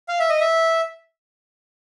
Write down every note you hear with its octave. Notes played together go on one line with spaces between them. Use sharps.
F5
E5
D#5
E5